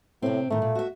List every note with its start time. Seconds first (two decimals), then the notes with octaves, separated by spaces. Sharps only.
0.22 A2 C3 C4
0.50 A2 D#3 A3
0.62 A#2
0.75 F#4 E5